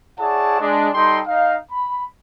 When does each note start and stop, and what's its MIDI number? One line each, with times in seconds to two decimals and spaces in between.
0.19 0.57 64
0.19 0.57 68
0.19 0.57 73
0.19 0.57 74
0.19 0.57 78
0.19 0.57 81
0.60 0.88 56
0.60 0.88 62
0.94 1.20 55
0.94 1.20 63
0.94 1.20 69
0.94 1.20 79
0.94 1.20 84
1.27 1.56 63
1.27 1.56 77
1.70 2.03 83